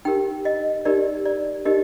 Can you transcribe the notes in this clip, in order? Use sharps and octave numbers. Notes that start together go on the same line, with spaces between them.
D#4 G4 A#4 G5
D#5
D#4 G4 A#4 D5
D5
D#4 G4 A#4 D#5